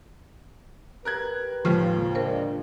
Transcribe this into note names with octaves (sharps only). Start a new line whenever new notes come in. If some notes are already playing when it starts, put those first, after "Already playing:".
G4 A#4 B4 F#6 G#6
D#2 A2 C#3 F3 G#3
G#3 A#3 D4 A#4 C5